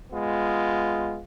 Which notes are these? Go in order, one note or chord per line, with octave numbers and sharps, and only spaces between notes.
G#3 B3 F4